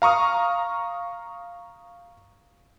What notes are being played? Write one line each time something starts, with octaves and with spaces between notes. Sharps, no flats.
F5 A#5 C#6 D#6 F6